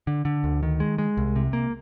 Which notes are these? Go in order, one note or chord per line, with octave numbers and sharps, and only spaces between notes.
D3
D3
D2
D#3
G#3
G#3
C2
C3
A#3